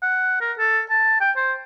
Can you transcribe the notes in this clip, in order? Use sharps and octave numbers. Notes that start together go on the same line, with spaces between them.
F#5
A#4
A4
A5
G5
C5